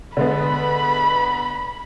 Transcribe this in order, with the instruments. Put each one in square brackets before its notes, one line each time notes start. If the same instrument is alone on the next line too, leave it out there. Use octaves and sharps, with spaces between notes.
[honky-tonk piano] D3 G#3 B3 [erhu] B5